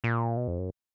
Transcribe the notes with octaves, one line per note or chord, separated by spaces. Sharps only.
A#2
B2
F2
F#2